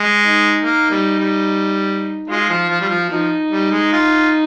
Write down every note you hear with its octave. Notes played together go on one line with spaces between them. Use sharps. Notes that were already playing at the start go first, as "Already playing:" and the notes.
Already playing: G#3
D#4
A#3
G3
G3
G#3 F4
F3
F3
G3
F3
F3 D#4
G3
G#3
F4